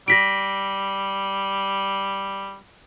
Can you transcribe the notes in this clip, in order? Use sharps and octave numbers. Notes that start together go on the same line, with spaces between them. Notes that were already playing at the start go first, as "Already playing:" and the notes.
G3 A#6 B6 D7